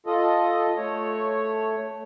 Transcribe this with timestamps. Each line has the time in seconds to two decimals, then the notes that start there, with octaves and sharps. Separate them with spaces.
0.06 F4 A4 D#5
0.77 A3 C#5